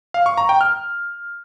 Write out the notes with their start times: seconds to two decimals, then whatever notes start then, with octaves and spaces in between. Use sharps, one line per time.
0.14 F5
0.26 C#6
0.38 A#5
0.49 G5
0.61 F6